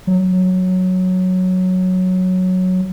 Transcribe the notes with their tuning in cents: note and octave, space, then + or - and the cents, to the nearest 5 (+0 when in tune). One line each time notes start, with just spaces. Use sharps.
F#3 -5